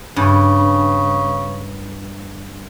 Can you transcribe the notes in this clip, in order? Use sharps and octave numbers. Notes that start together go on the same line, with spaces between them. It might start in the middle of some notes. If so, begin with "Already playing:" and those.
G2 C#3